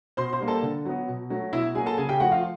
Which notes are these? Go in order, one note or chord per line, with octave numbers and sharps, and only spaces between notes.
B2 C5 C6
C5 C6
G3 A#3
A4 A5
D3
F#3 B3
B2
F#3 A3
B2 E4 E5
F#3 A#3 G#4 G#5
A4 A5
C#3 G#4 G#5
G4 G5
F3 A3 F#4 F#5
F4 F5